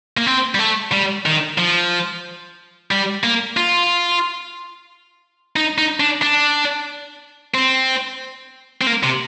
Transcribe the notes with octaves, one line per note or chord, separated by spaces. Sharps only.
A#3
C4
G3
A3
G3
D#3
F3
G3
A#3
F4
D#4
D#4
D4
D4
C4
C4
A#3
C3